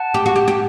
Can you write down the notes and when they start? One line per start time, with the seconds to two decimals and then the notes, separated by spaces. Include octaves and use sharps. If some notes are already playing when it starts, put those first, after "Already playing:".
Already playing: F#5 A5
0.14 G4
0.26 F#4
0.36 G4
0.48 G4